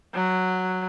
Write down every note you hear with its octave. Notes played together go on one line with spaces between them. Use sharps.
F#3